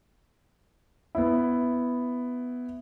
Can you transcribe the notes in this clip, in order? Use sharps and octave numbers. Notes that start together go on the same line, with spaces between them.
B3 E4